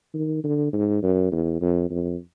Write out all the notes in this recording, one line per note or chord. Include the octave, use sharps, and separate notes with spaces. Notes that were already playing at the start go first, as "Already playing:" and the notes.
D#3
D3
G#2
F#2
E2
F2
F2